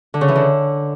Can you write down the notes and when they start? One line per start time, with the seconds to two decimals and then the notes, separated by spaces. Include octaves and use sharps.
0.14 D3
0.21 C#3
0.28 E3
0.36 D3